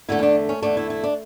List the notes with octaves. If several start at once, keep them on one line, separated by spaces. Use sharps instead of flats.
E2 D3 A3 E4
C#4
D4
C#4
E2 D3 A3 D4
E4
E4
D4